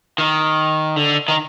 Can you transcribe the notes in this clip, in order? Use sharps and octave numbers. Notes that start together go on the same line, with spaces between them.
D#3
D3
D#3